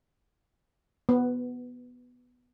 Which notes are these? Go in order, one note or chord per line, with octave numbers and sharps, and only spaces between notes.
B3